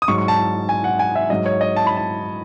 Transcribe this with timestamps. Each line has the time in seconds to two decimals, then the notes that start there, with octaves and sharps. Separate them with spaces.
0.02 D#6
0.08 G#2 F#3 C#6
0.18 C#6
0.28 A5
0.69 G#5
0.84 F#5
0.99 G#5
1.15 E5
1.30 G#2 F#3 D#5
1.46 C#5
1.61 D#5
1.76 A5
1.87 B5
1.97 A5